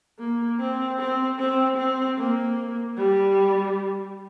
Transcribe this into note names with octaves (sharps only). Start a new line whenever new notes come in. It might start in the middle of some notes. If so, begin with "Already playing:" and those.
A#3
C4
C4
C4
C4
A#3
G3